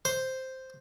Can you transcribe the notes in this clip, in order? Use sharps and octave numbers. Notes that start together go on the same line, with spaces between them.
C5